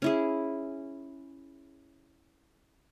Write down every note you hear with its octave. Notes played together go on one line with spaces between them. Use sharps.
C#4 E4 G#4